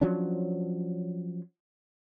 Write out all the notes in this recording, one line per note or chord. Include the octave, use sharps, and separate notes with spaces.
F3 F#3 C#4 D4